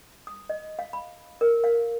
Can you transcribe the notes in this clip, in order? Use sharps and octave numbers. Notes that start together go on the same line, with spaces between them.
D#6
D#5
F5
B5
A#4
F5